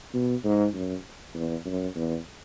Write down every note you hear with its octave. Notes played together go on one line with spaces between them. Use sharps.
B2
G#2
F#2
E2
F#2
E2